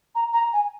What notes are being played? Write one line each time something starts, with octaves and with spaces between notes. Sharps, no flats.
A#5
A#5
G#5